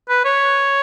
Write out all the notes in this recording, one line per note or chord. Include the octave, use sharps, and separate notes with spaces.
B4
C#5